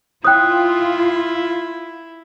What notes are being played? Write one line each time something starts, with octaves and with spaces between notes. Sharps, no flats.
E4 F4 C#5 G5 D#6 F#6